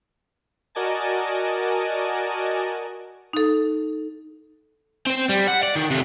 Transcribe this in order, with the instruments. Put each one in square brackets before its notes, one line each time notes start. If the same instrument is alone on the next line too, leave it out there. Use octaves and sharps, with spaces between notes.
[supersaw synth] F#4 A#4 D5 D#5 G#5 A5
[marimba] D#4 A4
[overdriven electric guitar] C4 C5
G3
F#5
D5
D#3
C3 A3